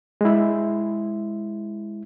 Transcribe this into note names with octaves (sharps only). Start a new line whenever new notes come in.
G#3 E4